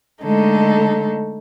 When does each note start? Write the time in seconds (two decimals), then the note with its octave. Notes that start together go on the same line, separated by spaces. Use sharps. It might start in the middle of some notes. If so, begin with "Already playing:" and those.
0.24 D3 G#3 A3 D#4 A4